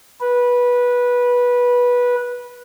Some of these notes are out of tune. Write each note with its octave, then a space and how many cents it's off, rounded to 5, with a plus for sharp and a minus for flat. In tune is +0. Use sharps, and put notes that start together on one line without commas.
B4 -15